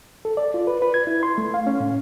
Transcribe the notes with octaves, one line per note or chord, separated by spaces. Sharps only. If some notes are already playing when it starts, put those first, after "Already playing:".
A4
D5
F4
B4
B4
G#6
E4
C6
A3
F5
C#4
A2